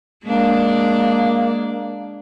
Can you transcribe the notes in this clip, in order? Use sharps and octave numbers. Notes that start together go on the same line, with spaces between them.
G#3 A#3 D4